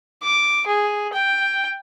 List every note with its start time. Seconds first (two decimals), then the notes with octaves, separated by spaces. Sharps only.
0.23 D6
0.67 G#4
1.13 G5